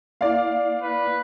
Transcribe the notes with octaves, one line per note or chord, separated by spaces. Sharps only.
A#3 E4 D5 F5
B4